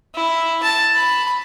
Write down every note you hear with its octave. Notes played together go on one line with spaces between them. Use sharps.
E4
A5
B5